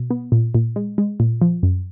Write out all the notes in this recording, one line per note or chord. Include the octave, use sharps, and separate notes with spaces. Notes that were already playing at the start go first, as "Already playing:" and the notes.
Already playing: B2
B3
A#2
A#2
G#3
G#3
A#2
F3
F#2